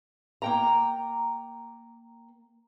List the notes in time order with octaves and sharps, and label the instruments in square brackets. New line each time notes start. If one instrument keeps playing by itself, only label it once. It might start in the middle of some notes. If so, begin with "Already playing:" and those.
[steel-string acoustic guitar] A#3 G5 A#5